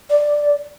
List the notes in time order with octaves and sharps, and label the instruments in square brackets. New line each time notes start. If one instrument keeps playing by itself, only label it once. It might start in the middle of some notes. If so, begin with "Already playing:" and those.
[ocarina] D5